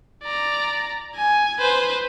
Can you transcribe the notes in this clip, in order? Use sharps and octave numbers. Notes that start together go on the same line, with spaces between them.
D5 A#5
G#5
B4 C5